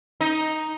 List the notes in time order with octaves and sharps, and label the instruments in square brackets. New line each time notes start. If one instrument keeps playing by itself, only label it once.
[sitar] D#4